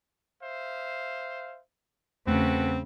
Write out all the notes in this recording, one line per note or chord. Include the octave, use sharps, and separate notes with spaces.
C5 E5 F5
E2 C#3 A3 C4 F#4 A4 B4